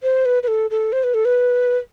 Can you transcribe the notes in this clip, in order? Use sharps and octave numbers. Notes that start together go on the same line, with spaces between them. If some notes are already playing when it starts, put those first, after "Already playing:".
C5
B4
B4
A4
A4
C5
B4
A4
B4